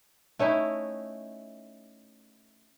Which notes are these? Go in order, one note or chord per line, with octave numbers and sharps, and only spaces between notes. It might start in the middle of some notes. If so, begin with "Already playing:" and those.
A3 C#4 D#4 E4